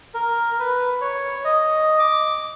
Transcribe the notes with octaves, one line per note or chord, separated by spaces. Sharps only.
A#4
B4
C#5
D#5
D6